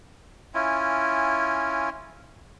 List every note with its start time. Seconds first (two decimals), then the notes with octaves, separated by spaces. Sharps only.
0.54 C#4 E4 F4 G#5